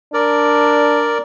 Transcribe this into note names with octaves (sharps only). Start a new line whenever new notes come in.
D4 A#4 D5